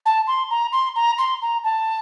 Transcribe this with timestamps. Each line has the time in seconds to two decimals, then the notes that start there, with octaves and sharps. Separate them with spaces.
0.06 A5
0.27 C6
0.51 A#5
0.73 C6
0.96 A#5
1.18 C6
1.42 A#5
1.64 A5